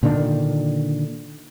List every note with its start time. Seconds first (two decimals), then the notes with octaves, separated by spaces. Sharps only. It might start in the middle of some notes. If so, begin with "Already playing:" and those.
0.03 A#2 D3 D#3 D4